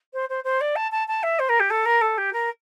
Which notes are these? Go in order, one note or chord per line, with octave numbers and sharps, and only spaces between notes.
C5
C5
C5
D5
A5
A5
A5
E5
C5
A#4
G4
A4
A#4
A4
G4
A#4